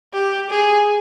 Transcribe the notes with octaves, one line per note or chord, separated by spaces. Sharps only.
G4
G#4